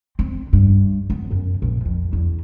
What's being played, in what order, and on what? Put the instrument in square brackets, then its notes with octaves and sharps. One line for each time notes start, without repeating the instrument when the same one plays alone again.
[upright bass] C4
G2
B3
F#2
A#1
F2
E2